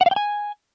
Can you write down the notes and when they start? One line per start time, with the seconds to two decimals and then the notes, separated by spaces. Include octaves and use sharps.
0.01 F#5
0.06 F5
0.11 G5
0.16 G#5